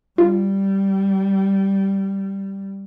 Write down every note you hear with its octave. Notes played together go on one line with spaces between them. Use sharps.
G3 F4